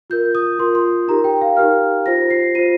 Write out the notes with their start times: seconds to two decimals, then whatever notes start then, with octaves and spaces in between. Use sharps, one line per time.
0.10 F4 A#4 G6
0.35 D#6
0.59 F4 A#4 C6
0.75 C6
1.08 D#4 G4 A#4 A#5
1.24 G5
1.41 F5
1.57 D#4 G4 A#4 F6
2.06 F4 C5 A#6
2.30 C7
2.55 F4 C5 D#7